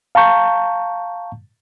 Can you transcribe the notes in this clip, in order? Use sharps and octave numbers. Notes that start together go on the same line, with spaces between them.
F5 A5 A#5 C#6 G6